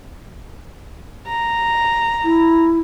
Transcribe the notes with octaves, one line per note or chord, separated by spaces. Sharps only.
A#5
E4